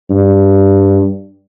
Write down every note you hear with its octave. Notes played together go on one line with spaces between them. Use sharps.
G2